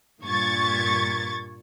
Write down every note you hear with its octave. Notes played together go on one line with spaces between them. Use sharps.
G2 A#2 C#6 G#6 A6